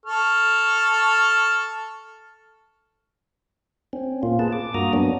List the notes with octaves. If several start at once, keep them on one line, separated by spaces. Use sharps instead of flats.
A4 C#6 F6
C4 C#4
A#2 A#3 F4
G#4 B4 A5
D6
G2 A#3 F#4 A#5 D#6
F#3 B3 C#4 D4